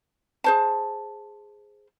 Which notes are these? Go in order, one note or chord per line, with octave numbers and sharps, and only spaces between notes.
G#4 C5 A5